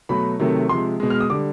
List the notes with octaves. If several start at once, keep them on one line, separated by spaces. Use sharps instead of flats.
B2 F#3 A3 B5
C3 D#3 F#3 A3
C3 F3 G#3 C6
B2 G#3
F6
D#6
D3 G3 D6